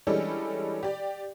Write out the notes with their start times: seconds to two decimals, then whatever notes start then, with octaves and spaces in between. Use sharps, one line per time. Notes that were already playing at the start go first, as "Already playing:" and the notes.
0.07 E3 G3 G#3 C#4 D4 A4
0.83 G4 D5